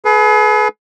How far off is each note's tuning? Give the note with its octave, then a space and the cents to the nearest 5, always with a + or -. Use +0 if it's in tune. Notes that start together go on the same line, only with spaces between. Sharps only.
G#4 +40 B4 +0